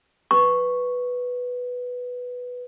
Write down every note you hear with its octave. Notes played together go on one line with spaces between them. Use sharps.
B4 C#6